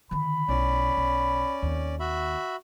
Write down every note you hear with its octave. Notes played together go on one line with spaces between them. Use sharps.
D3 D#3 B5
B1 C#4 E4 D5
B1
D#2 C4
F#4 E5 B5